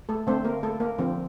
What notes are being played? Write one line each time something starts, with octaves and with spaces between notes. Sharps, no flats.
A3 A4
D3 A3 C4 C5
A#3 A#4
A3 A4
A#3 A#4
D3 F3 C4